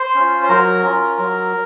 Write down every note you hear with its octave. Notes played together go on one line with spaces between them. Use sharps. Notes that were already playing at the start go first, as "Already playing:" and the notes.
Already playing: C5 C6
C#4 F4
C6
F#3 A#4 A#5
C#4 F4
F#3